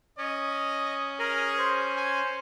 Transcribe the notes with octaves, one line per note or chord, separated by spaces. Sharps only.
C#4 D#5
G#4 A#4
C5
G#5